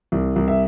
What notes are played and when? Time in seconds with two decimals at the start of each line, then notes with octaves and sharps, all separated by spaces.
0.12 C2
0.36 C2
0.48 E5